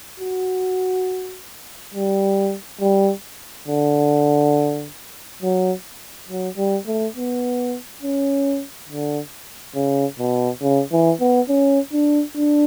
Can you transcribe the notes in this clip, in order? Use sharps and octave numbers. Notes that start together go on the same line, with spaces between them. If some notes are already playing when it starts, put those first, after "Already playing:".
F#4
G3
G3
D3
F#3
F#3
G3
A3
B3
C#4
D3
C#3
B2
C#3
E3
B3
C#4
D4
D4